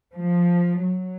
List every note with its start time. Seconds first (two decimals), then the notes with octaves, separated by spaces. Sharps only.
0.15 F3
0.82 F#3